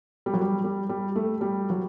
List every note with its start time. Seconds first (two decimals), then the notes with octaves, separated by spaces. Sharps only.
0.26 G3
0.33 F#3
0.41 G3
0.64 G3
0.89 G3
1.16 A3
1.41 G3
1.70 F#3